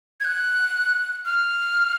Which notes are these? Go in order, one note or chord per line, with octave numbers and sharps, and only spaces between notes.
G#6
F#6
F6